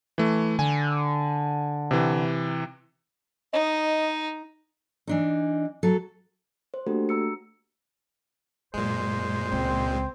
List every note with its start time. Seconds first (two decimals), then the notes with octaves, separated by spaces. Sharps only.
0.18 E3 A3
0.59 D3 G#5
1.91 C3 E3
3.53 D#4 D#5
5.07 E3 D4 D#4
5.83 F#3 A4
6.74 C5
6.87 A3 A#3 D4 F#4 G4 A4
7.09 A#5 E6 C#7
8.74 F#2 A#2 G#3 C5
9.52 C#2 C4